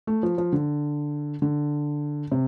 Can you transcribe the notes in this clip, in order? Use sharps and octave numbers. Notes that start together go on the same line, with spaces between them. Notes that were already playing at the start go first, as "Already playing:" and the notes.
A3
F3
F3
D3
D3
C3